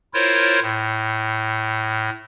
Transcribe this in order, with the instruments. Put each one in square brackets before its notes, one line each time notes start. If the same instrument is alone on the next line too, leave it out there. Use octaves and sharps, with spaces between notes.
[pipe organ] E4 F4 A#4 C5 C#5
A2